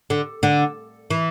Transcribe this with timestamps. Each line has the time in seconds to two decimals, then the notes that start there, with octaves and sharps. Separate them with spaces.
0.10 D3
0.43 D3
1.10 E3